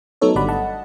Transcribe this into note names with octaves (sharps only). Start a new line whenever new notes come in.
F#3 A3 B3 D#4 A4 C#5
G#1 D3 G3 D5 F#5 B5
D#5 F#5 A5